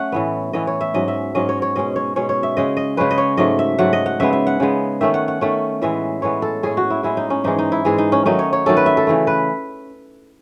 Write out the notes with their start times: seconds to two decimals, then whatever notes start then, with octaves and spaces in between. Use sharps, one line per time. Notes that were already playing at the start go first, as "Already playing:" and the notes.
Already playing: A3 C#4 F#5
0.12 A2 E3 B3
0.53 A2 E3 B3 D#5
0.67 C#5
0.81 E5
0.94 G#2 F#3 C#4 D#5
1.08 E5
1.35 G#2 F#3 C#4 D#5
1.49 C#5
1.62 C#5
1.76 B2 G#3 C#4 D#5
1.96 C#5
2.16 B2 G#3 C#4 C#5
2.29 C#5
2.43 E5
2.57 C#3 G#3 C#4 D#5
2.77 D#5
2.97 C#3 G#3 C#4 B4
3.11 D#5
3.18 C#5
3.37 G#2 F#3 A3 D#5
3.59 E5
3.79 G#2 F#3 A3 F#5
3.93 D#5
4.06 F#5
4.20 C#3 G#3 B3 E5
4.33 E5
4.47 F#5
4.60 C#3 G#3 B3
5.01 D#3 A3 C#4 E5
5.14 F#5
5.28 F#5
5.41 D#3 A3 C#4
5.82 A2 E3 G#3 B3 E5
6.22 A2 E3 G#3 B3 C#5
6.42 A4
6.63 A2 G#3 C#4 G#4
6.77 F#4
6.90 E4
7.03 A2 G#3 C#4 E4
7.17 D#4
7.30 C#4
7.44 G#2 E3 G#3 D#4
7.59 D#4
7.72 E4
7.85 G#2 E3 G#3 G#4
7.98 D#4
8.12 C#4
8.25 D#3 F#3 A3 C#4 D#4
8.39 C#5
8.53 C#5
8.66 D#3 F#3 A3 C#4 A4
8.77 B4
8.86 E5
8.97 A4
9.07 C#3 E3 A3
9.27 B4